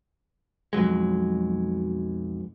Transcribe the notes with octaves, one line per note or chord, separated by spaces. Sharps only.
B1 F2 F#3 G#3